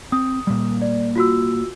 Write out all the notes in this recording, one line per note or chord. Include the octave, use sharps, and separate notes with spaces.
C4 D#6
A#2 G3
D5
F4 F#4 E6